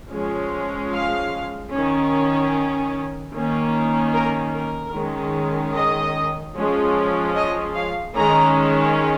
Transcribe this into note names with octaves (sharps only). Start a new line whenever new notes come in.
F3 G#3 C#4
F5
D#3 C#4
D#3 A#3 C#4
A#4
A#4
D#3 G#3 C#4
D#5
F3 G#3 C#4
D#5
F5
D#3 G#3 C#4 A#5